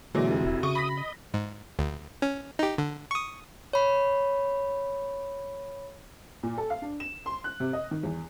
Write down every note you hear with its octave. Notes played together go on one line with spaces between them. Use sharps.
A#2 D3 E3 F#3 G#3 F#4 E5
F1 C3
D#1 E4
C#3 C#6 D#6
B5 A#6 B6
D#5
G#2
D2
C#4
D#4 G4
D3
C#6 D#6
C#5 B5
A#2
A4
F5
D4
E7
C6
F#6
C3
D#5
D#3
E2